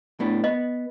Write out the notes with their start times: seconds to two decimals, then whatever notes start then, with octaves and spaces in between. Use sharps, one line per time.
0.20 A2 B3 D4
0.44 B3 D#5